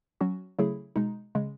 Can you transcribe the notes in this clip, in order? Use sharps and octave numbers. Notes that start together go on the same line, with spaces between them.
F#3 C#4 F#4
C#3 F#3 A3 E4 G#4
B2 G#3 D#4
C#3 G#3